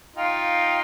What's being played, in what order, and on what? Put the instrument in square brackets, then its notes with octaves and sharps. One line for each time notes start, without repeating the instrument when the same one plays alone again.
[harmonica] D#4 F4 [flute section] F5 G5